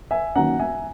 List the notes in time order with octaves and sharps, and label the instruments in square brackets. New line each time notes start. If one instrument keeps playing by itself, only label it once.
[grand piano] E5 G#5
D#3 F#3 A#3 C#4 F#5 A#5
E5 G#5